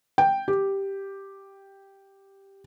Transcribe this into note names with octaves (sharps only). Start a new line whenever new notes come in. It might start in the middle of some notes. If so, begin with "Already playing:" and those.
G5
G4